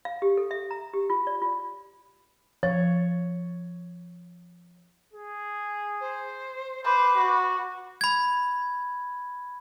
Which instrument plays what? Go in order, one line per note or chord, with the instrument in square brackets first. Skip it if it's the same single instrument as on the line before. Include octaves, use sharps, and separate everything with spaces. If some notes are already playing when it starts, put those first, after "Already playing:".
[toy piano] F5
G4
A4
E5
A#5
G4
F4
D5
F4
[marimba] F3 [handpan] C#5
[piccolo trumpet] G#4
[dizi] C5
[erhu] B4 [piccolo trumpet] C5 [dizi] D6
[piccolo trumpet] F#4
[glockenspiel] B5 G#6